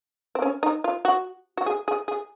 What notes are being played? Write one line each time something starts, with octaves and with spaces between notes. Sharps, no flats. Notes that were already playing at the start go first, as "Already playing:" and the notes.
C4
C#4
D#4
F4
F#4
F#4
G#4
G#4
G#4